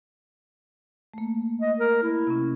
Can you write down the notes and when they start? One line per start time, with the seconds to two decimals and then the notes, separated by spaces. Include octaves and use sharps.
1.14 A3 A#3
1.62 D#5
1.80 A#4
2.03 E4
2.27 C3 C#4